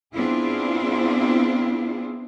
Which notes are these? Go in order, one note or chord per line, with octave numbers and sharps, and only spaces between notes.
B3 C4 D4 E4 F4 G#4